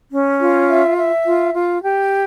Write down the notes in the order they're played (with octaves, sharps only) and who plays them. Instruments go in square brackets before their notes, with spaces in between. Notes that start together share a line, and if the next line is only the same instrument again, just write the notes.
[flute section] C#4
F4
E5
E5
F4
F4
G4